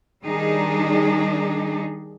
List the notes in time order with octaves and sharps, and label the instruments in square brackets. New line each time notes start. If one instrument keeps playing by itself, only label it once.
[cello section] D#3 G3 D4 D#4 G#4